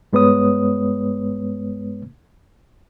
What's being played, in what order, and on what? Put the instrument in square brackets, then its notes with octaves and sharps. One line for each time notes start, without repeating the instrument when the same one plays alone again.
[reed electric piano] G2 G#3 B3 B4 C#5 D#6